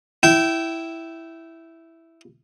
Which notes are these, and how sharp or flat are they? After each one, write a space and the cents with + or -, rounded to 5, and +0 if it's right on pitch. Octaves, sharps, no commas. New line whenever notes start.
E4 +0 G5 -20